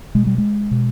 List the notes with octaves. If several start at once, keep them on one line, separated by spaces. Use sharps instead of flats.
B2 G#3
G3
G#3
B2